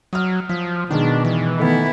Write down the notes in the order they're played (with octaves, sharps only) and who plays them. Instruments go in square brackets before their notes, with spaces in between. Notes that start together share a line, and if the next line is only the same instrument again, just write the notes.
[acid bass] F#3 [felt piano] D#6 F6
[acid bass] F3 [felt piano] B6
[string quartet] B2 [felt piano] D#3 G#3 [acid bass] D4
[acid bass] E3
[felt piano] D#3 A3 D#4 [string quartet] B3 E4